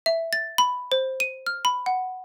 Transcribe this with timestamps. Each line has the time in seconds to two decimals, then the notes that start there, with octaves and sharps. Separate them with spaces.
0.06 E5
0.33 A6
0.58 B5
0.92 C5
1.20 D#7
1.46 F6
1.65 B5
1.86 F#5